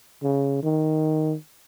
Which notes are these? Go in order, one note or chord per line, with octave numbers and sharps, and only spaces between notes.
C#3
D#3